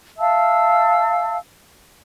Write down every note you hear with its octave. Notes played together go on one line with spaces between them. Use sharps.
E5 F5 A5 E6